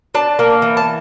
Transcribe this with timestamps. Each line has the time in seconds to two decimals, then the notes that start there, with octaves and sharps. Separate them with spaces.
0.15 D4 A5
0.39 A#3
0.62 E3
0.77 A5